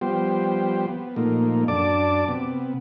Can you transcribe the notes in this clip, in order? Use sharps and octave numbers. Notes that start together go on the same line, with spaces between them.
F3 G3 B3 G4 C5
B3
A#2 F3 A3 A#3 D#4
F#2 D4 D5 A5 D6
C3 B3